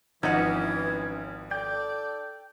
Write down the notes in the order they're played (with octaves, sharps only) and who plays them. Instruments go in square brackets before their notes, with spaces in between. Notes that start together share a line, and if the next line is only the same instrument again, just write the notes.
[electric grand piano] G#1 F3 [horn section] E3 [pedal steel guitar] C#4 [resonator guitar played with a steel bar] D#4 F#5
[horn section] A4 D5 [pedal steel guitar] G5